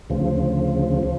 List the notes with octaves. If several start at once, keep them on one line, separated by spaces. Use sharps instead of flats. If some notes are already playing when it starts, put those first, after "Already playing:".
D2 C#3 F3
F3